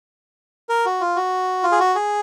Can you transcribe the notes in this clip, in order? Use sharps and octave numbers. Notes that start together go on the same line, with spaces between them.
A#4
F#4
F4
F#4
F4
G#4
F#4
G#4